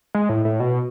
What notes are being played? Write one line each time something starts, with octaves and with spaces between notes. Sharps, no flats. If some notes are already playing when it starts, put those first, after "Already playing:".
G#3
A2
A2
B2